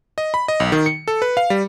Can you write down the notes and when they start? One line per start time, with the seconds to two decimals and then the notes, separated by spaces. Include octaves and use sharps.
0.18 D#5
0.34 B5
0.48 D#5
0.60 B1
0.72 D#3
0.86 C#7
1.08 A4
1.22 B4
1.37 F5
1.50 G3